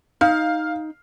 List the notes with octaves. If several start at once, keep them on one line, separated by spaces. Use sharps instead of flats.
D#4 F5